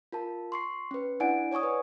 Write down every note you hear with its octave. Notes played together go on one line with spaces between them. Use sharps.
F4 A#4 A5
C6 C#6 C7
C#4 B4
D4 E4 D5 F#5 G#5 D7
C#5 D5 G#5 C#6 D#6
B4